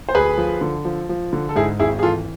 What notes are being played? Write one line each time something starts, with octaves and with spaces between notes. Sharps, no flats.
C5
D2 G#4 B4
F3
D3
F3
F3
D3
A4
G#2 E4 G#4
G#1 E4 G#4
G#4
E3 F4 A4